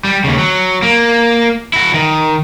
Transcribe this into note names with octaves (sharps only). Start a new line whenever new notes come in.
G3
D#2 C#3
F#3
A#3
E4 F#4
D#3